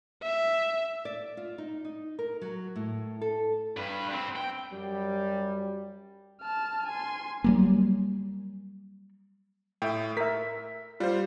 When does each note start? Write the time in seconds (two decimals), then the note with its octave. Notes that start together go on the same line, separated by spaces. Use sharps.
0.22 E5
1.05 D5
1.37 F4
1.58 D#4
1.85 D#4
2.19 A#4
2.42 F#3
2.76 A2
3.21 A4
3.77 G2 B4
4.08 G2 C4
4.35 G5
4.72 F#2 F#3 G3
6.42 A5 F6
6.87 G#5 C6
7.44 F#3 G3 A#3
9.82 A2 E5 G5
10.17 A#4 E5 B6
11.00 G3 F4 C5